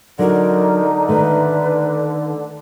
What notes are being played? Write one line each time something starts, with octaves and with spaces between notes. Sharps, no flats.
D3 F#3 D#4 F#4 A#4
D#3 A3 B4